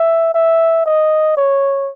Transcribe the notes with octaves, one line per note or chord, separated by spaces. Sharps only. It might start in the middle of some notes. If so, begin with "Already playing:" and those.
Already playing: E5
E5
D#5
C#5